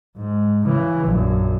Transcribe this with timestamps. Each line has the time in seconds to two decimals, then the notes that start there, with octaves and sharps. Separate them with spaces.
0.17 G#2
0.64 C#3 E3
1.05 A#1 F#2